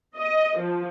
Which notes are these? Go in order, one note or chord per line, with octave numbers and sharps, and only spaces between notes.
D#5
F3